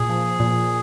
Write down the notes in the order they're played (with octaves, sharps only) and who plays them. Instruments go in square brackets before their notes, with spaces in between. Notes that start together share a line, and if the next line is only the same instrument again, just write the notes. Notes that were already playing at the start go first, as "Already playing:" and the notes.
Already playing: [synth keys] A#2 [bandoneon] G#4
[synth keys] F3
A#2